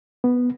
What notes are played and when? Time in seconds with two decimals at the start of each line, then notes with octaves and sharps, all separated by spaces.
0.24 B3